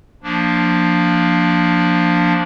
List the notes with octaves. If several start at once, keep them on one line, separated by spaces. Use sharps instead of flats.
F3 A#3 D4